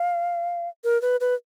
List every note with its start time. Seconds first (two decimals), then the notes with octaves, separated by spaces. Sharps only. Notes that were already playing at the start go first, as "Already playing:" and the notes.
Already playing: F5
0.84 A#4
1.02 B4
1.20 B4